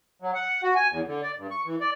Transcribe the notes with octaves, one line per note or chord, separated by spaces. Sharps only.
F#3
F#5
F#4
G#5
E2
D3
D5
G2
C#6
E3
D5